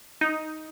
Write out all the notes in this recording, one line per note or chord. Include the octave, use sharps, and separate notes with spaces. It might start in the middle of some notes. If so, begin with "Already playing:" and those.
D#4